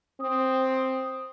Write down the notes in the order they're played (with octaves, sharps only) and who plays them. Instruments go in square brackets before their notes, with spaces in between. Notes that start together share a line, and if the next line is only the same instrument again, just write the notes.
[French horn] C4 [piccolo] D#6